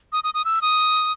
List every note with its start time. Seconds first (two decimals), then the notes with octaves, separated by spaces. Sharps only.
0.13 D#6
0.24 D#6
0.34 D#6
0.45 E6
0.62 D#6